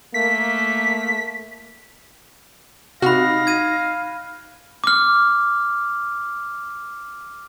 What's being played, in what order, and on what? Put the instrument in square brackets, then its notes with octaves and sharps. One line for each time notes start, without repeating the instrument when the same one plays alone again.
[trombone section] A3 A#3 [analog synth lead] B6
[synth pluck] C3 F#4 [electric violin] D#4 A#6 [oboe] F5 [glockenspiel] B5 F#6
[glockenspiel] G#6 D#7
D6 F6